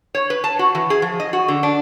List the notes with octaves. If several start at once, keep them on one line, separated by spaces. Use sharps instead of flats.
C#5
B4
A5
F#4
E3
G#4
F3
D#5
F#4
D3
D4